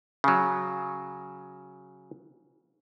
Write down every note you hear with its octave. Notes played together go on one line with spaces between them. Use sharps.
C#3 F#3